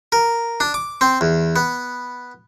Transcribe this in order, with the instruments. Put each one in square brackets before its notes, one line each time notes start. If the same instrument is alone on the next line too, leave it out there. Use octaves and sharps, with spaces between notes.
[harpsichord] A#4
D4
D6
C4
E2
B3